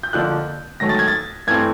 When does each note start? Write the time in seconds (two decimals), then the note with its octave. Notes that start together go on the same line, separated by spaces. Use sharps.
0.03 G6
0.13 F2 D3 F3 A#3 F#6
0.80 G#2 D#3 F#3 A3 A#6
0.89 A6
0.99 G#6
1.08 A6
1.47 G2 E3 A3 C4 G#6